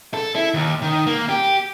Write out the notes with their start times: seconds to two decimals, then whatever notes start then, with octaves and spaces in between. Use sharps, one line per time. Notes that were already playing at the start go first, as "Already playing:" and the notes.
0.14 A4
0.35 E4
0.54 D#2
0.82 D#3
1.07 A#3
1.29 G4